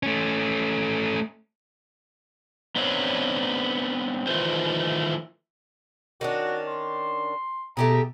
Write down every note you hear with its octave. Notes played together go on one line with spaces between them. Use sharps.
A3 C#4
B3 C4 D4 B4 C#5 F5
D#3 E3 A3 F4 B4 C5
D#3 C#4 D4 F#4
C6
B2 A3 G4 G#4 A#5